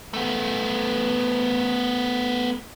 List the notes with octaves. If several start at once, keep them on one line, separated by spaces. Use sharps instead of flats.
A3 B3